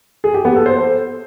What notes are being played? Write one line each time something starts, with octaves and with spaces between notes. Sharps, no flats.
G#4
G4
B3
A4
C5